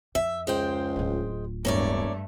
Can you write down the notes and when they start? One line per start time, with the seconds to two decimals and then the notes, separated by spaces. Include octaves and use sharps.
0.15 F2 E5
0.47 C#2 G#3 C5 G5
0.96 D1 F4
1.65 E1 G2 A3 A#3 C#5 D5